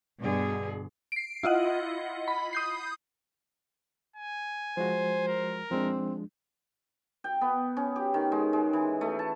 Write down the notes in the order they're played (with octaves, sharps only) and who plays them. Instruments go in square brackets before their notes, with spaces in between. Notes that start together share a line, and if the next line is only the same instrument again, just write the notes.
[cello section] G2 B2 D3 G#4
[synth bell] C7 D7
E4 F4 D#5 F#5
B5
D#6 G6 C7
[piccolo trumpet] G#5
[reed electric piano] F3 G#3 F#4 [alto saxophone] C5
[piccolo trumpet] A#4
[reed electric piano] F3 G#3 D4 [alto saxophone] C4
[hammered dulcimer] G5
B3
C#4
G4
D#3
G#3
G#3
E3
A3
A5